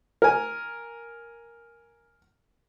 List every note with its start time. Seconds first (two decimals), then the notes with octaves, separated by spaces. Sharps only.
0.22 A#4 G#5